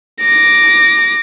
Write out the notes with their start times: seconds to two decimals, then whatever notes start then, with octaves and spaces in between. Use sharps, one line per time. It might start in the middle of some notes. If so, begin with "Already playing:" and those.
0.21 D6 A#6